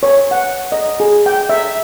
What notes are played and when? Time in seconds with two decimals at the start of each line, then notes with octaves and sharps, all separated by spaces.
0.03 C#5
0.31 F#5
0.72 D#5
1.00 G#4
1.26 G5
1.49 E5